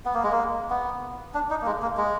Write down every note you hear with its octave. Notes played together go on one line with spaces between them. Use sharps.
B3
A#3
G#3
A#3
B3
D4
D#4
A#3
G#3
A#3
G#3